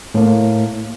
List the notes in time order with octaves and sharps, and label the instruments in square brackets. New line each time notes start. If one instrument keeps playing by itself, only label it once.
[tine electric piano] A2 A#3